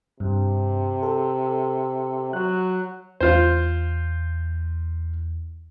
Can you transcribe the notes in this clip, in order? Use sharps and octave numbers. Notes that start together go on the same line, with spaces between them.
G2 C3
A4
F#3 F#6
E2 F4 C5